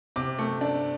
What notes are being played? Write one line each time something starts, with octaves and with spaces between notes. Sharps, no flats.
C3 D6
A3
D4